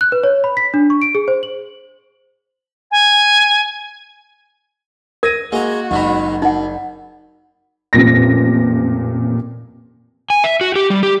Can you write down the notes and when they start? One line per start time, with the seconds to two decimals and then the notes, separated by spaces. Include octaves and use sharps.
0.01 F#6
0.12 B4
0.24 C#5
0.44 B5
0.57 B6
0.74 D4
0.90 C#6
1.02 D7
1.15 G#4
1.28 C5
1.43 F#7
2.91 G#5
5.23 A#4 G#6 A#6 D#7
5.52 G#3 A#3 F#4 A#5
5.91 F#1 G#2 D#3 F#3 B5
6.42 F#2 D#4 F#5
7.93 A1 F2 A#2 A#6
10.30 G#5
10.44 E5
10.61 F#4
10.76 G4
10.90 G3
11.03 G4